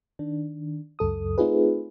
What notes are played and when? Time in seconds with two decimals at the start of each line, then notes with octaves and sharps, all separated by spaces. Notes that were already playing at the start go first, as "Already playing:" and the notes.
0.19 D#3 D4
0.99 C#2 F#2 A4 D#6
1.38 A3 C4 D#4 F4 G#4 B4